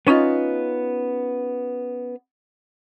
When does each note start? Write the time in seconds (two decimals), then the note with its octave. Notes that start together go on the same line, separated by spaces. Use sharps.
0.07 B3 C#4 D#4 F4